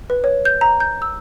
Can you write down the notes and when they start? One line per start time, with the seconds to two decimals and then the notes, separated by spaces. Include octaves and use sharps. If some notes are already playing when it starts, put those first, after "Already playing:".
0.10 B4
0.24 C#5
0.45 G6
0.61 A#5
0.80 G6
1.02 E6